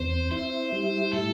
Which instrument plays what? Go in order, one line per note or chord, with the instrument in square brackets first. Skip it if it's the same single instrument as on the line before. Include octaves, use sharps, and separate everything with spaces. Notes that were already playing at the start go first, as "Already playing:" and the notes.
Already playing: [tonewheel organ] E2 C4 [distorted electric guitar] C5
[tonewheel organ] E4 [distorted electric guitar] C5
[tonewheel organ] G3
[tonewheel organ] A2 [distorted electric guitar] A4